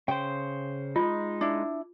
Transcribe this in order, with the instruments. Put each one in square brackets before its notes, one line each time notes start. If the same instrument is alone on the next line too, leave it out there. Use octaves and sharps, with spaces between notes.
[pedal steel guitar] C#3 C5 [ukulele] G5
[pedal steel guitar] G#3 D#4 [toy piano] F4
[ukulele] D4 E4